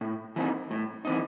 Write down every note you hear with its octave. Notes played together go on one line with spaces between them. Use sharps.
A2
E3 C4 D#4
A2
E3 C4 D#4